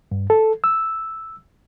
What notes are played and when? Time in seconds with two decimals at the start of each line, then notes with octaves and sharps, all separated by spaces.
0.12 G2
0.30 A4
0.64 E6